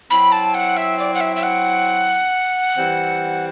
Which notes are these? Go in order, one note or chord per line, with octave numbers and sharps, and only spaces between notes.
F#3 C4 E4 B5
A5
F#5
E5
D5
F#5
E5
E5
F#5
E3 G3 C4